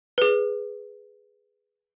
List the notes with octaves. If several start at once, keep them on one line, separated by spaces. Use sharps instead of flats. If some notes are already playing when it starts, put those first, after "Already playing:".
G#4 B4